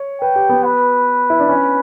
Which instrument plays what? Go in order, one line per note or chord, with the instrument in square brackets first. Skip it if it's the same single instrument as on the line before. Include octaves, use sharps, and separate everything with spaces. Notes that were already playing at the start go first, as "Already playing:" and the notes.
Already playing: [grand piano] C#5
[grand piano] B4 [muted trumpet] G5
[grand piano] G4
B3
[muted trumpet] B4
[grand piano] E4
D4
C#4